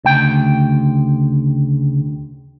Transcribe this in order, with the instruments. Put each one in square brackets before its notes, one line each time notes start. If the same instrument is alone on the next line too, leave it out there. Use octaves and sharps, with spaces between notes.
[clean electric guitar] D2 G5 [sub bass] C#3